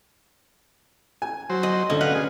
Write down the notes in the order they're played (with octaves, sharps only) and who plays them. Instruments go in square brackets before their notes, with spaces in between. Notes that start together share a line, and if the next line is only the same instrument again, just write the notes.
[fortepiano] G#5
[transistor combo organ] F#3 C5
[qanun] D#5
[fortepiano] D2 D3 D#5 [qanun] C#4
[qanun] B4 [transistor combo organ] F5 F#5
[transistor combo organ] G#4